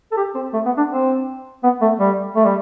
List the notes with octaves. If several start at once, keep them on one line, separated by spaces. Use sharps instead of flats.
A4
G4
C4
A3
B3
D4
C4
B3
A3
G3
A3
G3